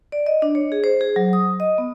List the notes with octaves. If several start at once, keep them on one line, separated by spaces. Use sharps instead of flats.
D5
D#5
D4
C#5
G#4
C5
G#4
F#3
D#6
D#5
B3